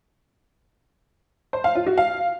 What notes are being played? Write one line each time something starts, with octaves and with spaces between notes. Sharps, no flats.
C5
F5
F4
F#4
F5